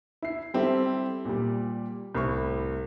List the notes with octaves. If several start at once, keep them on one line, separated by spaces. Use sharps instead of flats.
E4 C7
G3 C4 E4 G4 A4
A#2 G3
C2 A2 B5 C#6